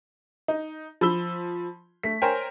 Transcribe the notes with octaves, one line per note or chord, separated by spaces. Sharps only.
D#4
F3 B5 E6 G7
A3 B6
A#4 C5 C#5 G5 G#5